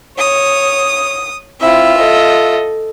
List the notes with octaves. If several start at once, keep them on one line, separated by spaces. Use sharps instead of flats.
C#5 D#6
C4 E4 F4 E5
A4 D#5